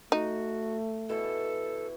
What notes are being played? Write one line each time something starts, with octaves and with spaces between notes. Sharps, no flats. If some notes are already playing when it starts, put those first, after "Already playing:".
A3 D#4 F#4
B2 E3 A4 E5